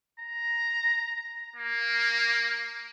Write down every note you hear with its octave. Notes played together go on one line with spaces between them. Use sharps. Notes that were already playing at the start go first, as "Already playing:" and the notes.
A#5
A#3